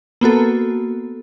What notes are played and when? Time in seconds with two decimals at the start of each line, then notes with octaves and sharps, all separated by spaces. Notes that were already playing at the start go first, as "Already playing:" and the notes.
0.21 A#3 B3 F#4 A4